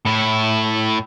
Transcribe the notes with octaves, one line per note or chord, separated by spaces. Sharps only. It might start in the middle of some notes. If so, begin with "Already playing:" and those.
A2 E4